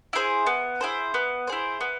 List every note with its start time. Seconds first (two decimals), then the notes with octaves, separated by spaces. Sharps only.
0.13 E4 G#4 C5
0.46 B3
0.81 E4 G#4 C5
1.14 B3
1.47 E4 G#4 C5
1.81 B3